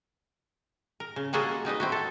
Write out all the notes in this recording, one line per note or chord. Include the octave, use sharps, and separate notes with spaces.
A#4
C#3
G3 G#3 A#3 F#4 G#4 A4
G3 D#4 B4 D#5
C4 E4 F#4
A4